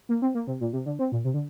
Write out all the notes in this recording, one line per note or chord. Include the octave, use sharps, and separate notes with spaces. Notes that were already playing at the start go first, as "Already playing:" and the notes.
A#3
C4
A#3
C3
A#2
C3
D3
C4
A#2
C3
D3